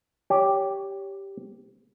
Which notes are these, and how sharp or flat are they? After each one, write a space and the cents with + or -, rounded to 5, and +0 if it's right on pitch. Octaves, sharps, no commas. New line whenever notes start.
G4 +0 C#5 +20